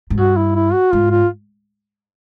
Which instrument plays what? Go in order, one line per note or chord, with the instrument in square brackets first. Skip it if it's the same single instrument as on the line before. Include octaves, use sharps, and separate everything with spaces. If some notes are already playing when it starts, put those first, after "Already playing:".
[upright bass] G#2
[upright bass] G2 [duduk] F#4
[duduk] E4
E4
F#4
[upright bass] G#2 [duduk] F4
[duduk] F4